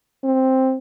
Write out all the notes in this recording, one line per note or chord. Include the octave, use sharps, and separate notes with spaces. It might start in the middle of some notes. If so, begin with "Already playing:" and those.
C4